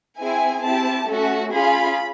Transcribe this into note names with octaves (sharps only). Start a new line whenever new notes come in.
C4 E4 G#4 G#5
C4 E4 G4 A5
A3 C#4 F#4 A4
C#4 F4 G#4 B5